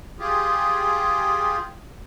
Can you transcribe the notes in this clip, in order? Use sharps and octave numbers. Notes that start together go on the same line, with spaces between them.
F4 G4 G#4